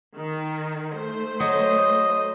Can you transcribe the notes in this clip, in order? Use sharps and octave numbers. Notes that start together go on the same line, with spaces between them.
D#3
A3 C5
F#3 D#5